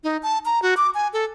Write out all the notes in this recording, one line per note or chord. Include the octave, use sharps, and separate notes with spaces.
D#4
A5
A#5
F#4
D6
G#5
A4